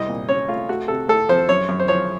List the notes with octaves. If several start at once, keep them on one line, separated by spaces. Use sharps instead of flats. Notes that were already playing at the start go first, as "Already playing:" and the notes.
Already playing: C2 D#5
A#2
C#4 C#5
A3 F4
A3 F#4
C3 A4
A3 A4
F3 C5
F#2 C#5
F#2
C5
F3 C#5